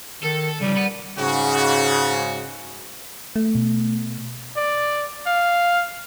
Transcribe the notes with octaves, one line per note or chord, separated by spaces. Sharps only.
D#3 A4
C#3 F3 G3
F#5 B5
G#2 C#3 F#4
A3
B2
D5
F5